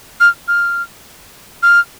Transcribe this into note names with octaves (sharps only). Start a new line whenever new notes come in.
F6
F6
F6